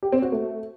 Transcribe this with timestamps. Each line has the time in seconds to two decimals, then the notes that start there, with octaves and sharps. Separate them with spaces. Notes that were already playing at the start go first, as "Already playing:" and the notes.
0.03 G4
0.12 C4
0.22 F#4
0.32 A3